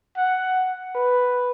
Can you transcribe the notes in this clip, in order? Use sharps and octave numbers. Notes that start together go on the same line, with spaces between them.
F#5
B4